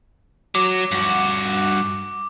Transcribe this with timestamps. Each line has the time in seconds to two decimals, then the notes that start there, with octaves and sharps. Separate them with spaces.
0.55 F#3 D6
0.92 G2 F#4